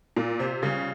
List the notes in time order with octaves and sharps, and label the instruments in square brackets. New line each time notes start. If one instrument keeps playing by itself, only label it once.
[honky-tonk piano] A#2 [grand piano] F4
[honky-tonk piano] C3 [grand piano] C5
[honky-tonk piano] C#3 [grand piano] G3